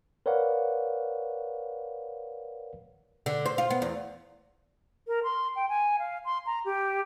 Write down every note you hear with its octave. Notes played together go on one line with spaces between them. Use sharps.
A#4 B4 C#5 D5 F5 F#5
D3
C5
F4
B3
E2
A#4
C6
G5
G#5
F5
C6
A#5
G4